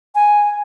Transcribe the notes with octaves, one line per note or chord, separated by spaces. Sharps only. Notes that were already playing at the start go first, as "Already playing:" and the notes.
G#5